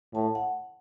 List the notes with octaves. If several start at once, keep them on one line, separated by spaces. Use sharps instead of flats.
A2 A5
F#5